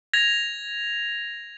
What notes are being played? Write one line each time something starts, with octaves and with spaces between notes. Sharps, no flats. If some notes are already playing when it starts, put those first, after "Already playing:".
G#6 A#6 F7